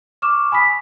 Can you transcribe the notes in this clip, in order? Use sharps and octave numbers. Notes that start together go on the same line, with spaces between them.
C#6 D6 F6 E7
G#5 B5 D#6 B6